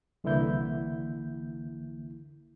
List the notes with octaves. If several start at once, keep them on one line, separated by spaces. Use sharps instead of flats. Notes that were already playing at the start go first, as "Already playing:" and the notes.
C2 D3 E3 A#3 E4 G6